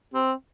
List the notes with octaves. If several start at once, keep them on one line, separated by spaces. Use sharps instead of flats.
C4